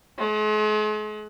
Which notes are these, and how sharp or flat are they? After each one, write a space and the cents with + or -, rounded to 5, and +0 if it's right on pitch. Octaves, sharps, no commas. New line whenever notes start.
G#3 +45